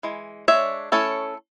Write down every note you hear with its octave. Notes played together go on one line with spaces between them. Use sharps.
E3 G#3
G#3 D4 C#5 E5
A3 C#4 E4 A4 C#5